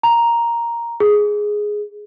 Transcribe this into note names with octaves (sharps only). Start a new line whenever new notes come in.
A#5
G#4